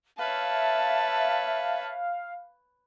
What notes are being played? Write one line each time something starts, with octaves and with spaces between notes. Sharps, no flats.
B4 C#5 E5 F5 A5